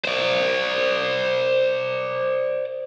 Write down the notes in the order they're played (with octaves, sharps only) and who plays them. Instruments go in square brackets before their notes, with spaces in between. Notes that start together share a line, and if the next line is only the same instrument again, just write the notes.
[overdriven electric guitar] C5 D5